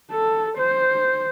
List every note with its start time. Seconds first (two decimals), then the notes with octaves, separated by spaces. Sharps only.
0.11 A4
0.58 C5